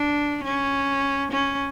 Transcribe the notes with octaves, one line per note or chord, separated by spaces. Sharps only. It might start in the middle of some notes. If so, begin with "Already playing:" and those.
Already playing: D4
C#4
C#4